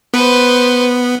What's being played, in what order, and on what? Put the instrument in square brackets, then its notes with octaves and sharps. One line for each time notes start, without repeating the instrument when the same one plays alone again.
[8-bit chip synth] B3 [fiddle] B4 C5